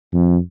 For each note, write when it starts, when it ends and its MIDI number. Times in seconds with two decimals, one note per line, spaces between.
0.13 0.37 41